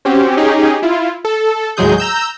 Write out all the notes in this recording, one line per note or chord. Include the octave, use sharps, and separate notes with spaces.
C4 C#4 F#4 G4
C#4 D#4 G4 G#4
E4 F4
A4
D#2 A2 F#3 G#3 G#4 G6
A#5 E6 G6